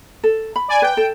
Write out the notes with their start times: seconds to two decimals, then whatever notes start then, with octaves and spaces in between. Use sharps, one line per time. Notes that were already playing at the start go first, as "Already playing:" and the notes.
0.24 A4
0.56 B5
0.68 D5 G#5
0.82 B4 G5
0.97 A4